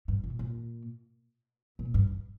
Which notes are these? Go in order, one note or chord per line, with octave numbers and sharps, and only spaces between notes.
G2
A#2
A#2
A#2
G2